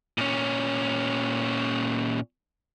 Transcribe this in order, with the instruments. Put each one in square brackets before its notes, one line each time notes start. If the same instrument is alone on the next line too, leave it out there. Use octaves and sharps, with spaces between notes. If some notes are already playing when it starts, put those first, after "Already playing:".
[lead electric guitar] A#2 C#4